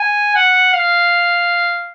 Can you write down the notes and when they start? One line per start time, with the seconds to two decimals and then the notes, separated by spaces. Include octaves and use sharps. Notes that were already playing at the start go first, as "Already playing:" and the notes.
Already playing: G#5
0.35 F#5
0.74 F5